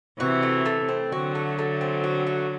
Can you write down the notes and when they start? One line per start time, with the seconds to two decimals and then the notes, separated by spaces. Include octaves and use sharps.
0.20 C3 E3 F#4
0.43 A3
0.66 A3
0.89 C4
1.11 D3 F#3 F#4
1.35 A3
1.59 A3
1.81 C4
2.04 F#4
2.27 A3